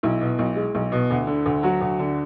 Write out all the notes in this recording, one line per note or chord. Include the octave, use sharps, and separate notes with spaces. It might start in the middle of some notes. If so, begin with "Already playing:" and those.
B1 E4
B2
B1
G#3
B1
B2
D2
D3
D2
F#3 F#4
D2
D3